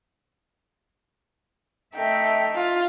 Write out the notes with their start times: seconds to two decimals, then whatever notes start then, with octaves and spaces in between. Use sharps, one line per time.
1.95 A3 D#4 E5 G5
2.55 F4